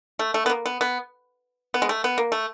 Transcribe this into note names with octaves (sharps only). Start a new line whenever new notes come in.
A3
A3
B3
A#3
B3
B3
B3
G#3
A3
B3
A#3
A3